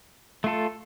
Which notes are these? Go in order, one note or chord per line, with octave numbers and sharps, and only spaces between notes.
A3 F4 A4